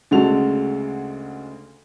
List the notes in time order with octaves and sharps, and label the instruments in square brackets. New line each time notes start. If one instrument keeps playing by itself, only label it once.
[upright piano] D2 C#3 G#3 F#4 A4 F7